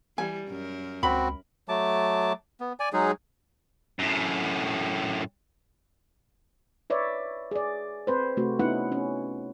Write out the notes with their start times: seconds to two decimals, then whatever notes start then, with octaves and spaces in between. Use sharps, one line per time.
0.18 E3 G3 G#5
0.48 F#2 A#4
1.03 C#2 C4 F#4 B5
1.69 F#3 A3 A5 D6
2.61 B3
2.80 D5 G#5
2.93 F#3 G#3 D#4 G#4
3.99 F#2 A2
6.90 B4 C#5 D5 E5
7.51 G#4 D5
8.07 C4 B4 C5
8.37 C3 A3 C4 F#4
8.59 B3 C#4 D#4 E4 B4 F#5
8.92 C#4